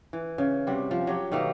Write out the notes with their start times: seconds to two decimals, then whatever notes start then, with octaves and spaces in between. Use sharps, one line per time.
0.13 E3
0.38 C#3
0.67 C3 G3 F#4
0.91 F3
1.07 F#3 G4 C#5
1.32 B2 D#3 A3 A#3